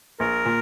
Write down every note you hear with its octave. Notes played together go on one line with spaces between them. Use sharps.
A#1 A#4
A#2